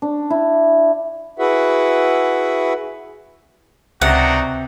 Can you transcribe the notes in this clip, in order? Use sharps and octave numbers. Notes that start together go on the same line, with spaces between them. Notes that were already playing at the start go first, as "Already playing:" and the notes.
D4
E4
E4 F#4 G#4 B4 E5 F#5
C#2 C3 D4 D#4 F#4 F#5